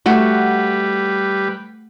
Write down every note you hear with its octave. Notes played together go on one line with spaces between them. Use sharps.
G3 A3 F#4 B4